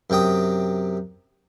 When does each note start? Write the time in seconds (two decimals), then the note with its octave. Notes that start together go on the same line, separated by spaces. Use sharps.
0.10 F#2 C3 G5 D#6